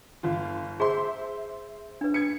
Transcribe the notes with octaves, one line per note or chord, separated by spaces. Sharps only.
G1 F4
G#4 C5 E5 C6
D4 B4
G#6 C#7